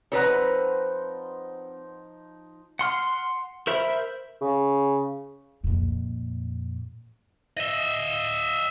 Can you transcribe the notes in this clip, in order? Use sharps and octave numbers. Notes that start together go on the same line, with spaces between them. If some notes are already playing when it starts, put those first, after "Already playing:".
F3 C4 D#4 B4 C#5 F#5 A#5
F#5 C6 F6
A#4 C5 E5 B5
C#3
F2 A#2
D#5 E5